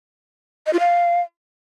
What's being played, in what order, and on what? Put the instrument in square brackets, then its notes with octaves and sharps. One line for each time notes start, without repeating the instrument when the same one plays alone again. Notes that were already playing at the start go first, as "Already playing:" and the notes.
[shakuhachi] D#5
F4
F5